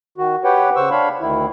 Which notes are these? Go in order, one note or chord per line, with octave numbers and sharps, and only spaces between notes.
D#3 F#4
G4 B4 C#5 F#5 G5
C#3 C5 F#5 C#6 E6
D4 C#5 F5 B5
D2 D#3 E4